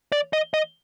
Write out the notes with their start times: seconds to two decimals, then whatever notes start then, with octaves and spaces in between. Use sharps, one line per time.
0.12 D5
0.33 D#5
0.54 D#5